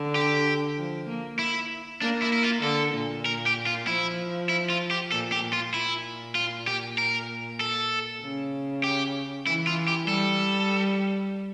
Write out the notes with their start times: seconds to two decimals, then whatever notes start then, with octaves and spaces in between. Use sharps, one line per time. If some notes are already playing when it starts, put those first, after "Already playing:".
Already playing: D3
0.15 G4
0.77 F3
1.08 A#3
1.39 E4
2.01 A#3 D4
2.22 E4
2.33 E4
2.43 F4
2.63 D3 A4
2.94 A#2
3.26 A#4
3.46 G4
3.67 F4
3.87 F3 E4
4.49 E4
4.70 F4
4.91 G4
5.11 A#2 A4
5.32 G4
5.53 F4
5.73 A#2 E4
6.35 F4
6.67 G4
6.98 A#4
7.60 A4
8.21 C#3
8.84 G4
9.46 E3 E4
9.67 F4
9.88 G4
10.08 G3 A4